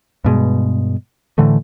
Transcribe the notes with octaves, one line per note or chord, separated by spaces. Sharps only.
G2 B2 G#3
A2 D3 E3 A3